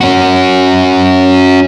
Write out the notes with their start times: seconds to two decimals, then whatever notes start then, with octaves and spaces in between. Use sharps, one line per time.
0.01 C#4 F#4